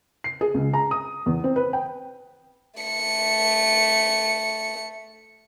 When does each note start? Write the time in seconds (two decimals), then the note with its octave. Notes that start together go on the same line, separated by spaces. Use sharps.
0.24 C7
0.41 G#4
0.54 C#2
0.73 A#5
0.91 D#6
1.26 E2
1.44 C4
1.56 B4
1.73 G5
2.80 A3 C#7